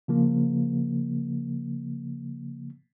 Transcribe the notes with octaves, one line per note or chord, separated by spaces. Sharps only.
C#3 F3 A#3